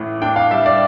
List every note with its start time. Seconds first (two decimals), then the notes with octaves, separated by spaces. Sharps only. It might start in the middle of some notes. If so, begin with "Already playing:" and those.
Already playing: A1 A2
0.22 D4 G5
0.36 F5
0.51 G3 E5
0.66 D5